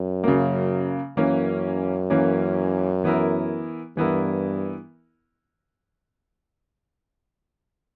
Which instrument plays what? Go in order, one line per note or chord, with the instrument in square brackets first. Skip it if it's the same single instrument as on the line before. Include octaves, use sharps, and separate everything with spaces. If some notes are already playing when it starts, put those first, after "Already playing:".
Already playing: [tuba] F#2
[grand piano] C#3 F#3 A#3
[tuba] F#2 [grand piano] E3 A#3 C#4
[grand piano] E3 A#3 C#4
E3 B3 E4 A#4
[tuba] G2 [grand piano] E3 B3 E4 A#4